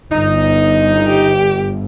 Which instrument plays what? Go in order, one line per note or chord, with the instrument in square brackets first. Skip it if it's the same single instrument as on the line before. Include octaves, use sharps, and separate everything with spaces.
[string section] G1 [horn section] D#4
[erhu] G4